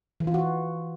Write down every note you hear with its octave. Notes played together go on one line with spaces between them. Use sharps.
E3
F4
F#4